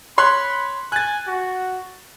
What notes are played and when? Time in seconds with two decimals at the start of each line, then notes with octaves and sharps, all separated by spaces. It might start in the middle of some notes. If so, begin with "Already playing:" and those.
0.18 C#5 B5 C6 F#6
0.92 G#5 F#6 A6
1.27 F#4